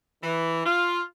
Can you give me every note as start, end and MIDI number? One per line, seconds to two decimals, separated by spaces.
0.22 0.64 52
0.66 1.02 65